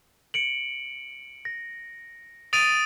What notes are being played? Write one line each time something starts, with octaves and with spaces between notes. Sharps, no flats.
C#7 D7 F#7
A#6
D#6 A6 D7 D#7 F7